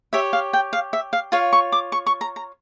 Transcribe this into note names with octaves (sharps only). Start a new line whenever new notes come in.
G4 C#5 E5
F5
G5
F5
E5
F5
F4 C#5 F5
C#6
D6
C#6
C#6
A#5
A#5